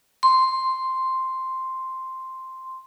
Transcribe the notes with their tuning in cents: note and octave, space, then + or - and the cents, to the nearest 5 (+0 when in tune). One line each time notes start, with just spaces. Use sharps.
C6 +0